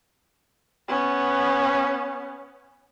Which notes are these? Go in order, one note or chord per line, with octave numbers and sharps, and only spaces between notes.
B3 C#4